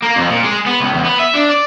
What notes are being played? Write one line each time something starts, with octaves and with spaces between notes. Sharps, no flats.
A#3
F2
A#2
G#3
B3
C#2
E2
B3
E5
D4
D5